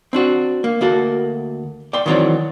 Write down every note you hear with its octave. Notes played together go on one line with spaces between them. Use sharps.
C4 D4 F#4
A#3
D2 A#3 F#4 A4
D5 G5 C6
D#3 E3 F#3 C4 C#5 D5